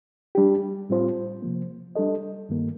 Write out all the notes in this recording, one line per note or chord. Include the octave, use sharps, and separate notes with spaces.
G3 D4 G4
A2 G3 C4 F4 C5
C3 F3 A#3
G3 D4 A4 D#5
G2 D#3 G3 A#3